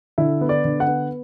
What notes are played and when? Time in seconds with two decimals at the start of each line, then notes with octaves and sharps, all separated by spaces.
0.18 D3 E4
0.41 B3
0.49 D5
0.65 D3
0.80 F#5
0.88 B3